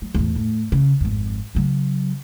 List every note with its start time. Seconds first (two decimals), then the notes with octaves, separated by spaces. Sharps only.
0.02 F#3
0.15 E2 A2
0.36 A2
0.72 C#3
1.01 G#1 F2
1.55 C#3 F#3